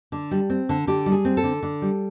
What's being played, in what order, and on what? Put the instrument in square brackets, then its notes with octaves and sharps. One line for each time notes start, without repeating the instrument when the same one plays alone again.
[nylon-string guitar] D3
G3
C4
D3
D3 G4
G3
G#4
C4
A4
D3
D3
G3